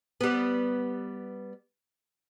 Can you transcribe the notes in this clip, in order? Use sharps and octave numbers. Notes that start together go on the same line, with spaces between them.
G3 B3